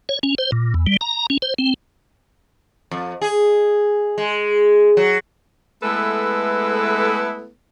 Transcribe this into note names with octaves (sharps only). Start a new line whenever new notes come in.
C#5
C#4
C5
A#2
E2
G3
A#5
C#4
C5
C4
F2
G#4
G#3
F#3
G#3 A3 B3 E4 A4 B4